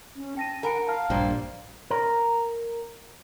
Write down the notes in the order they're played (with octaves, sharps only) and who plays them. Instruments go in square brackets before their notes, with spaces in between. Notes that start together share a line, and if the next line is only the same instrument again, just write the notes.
[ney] C#4
[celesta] G5 A#6 D#7 [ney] A5
[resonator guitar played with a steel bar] A#4 [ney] F#5 [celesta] G#5 B5 D7
[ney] F5 [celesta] A5 F6
[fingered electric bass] A#1 G2 [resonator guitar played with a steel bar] A#3 C5 D5 [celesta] G5
[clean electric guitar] A#4